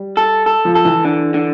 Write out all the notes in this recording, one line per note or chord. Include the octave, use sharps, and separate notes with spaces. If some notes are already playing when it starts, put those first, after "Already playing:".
Already playing: G3
A4
A4
F3
A4
E3
D3
D3